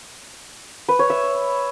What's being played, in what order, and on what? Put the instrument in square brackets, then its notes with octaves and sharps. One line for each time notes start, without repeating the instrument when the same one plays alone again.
[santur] B4
C#5
E5